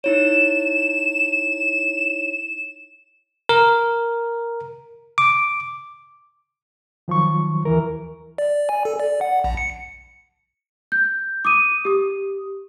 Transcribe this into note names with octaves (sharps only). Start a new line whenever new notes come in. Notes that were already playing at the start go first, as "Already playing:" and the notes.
D#4 E4 C#5 E7
A#4
D6
D#3 F3 F#3 C#6
D#2 E3 A#4
D5
G#5
A4
D5
F#5
A#1
C#7
G6
D6 D#6 D#7
G4 D#6